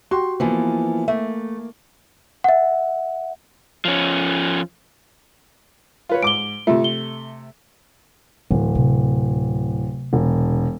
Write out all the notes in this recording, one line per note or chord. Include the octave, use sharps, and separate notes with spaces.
F#4 G4 C6
E3 F3 A#3 B3
A3 A#3 E5
E5 F#5
F3 C#4
F4 B4 C#5
G#2 D6 D7 G7
C3 A3 F4 E5
G7
D1 E3
C3
E1